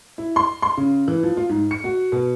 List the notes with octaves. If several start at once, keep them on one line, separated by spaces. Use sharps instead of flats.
E4
C6
C6
C#3
E3
F3
F4
G#2
C#7
F#4
B2